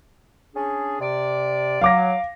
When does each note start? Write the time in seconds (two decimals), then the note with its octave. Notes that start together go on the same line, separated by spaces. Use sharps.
0.55 C#4 D4 G#4
1.01 C3 D5
1.81 F#3 F5 D6 A#6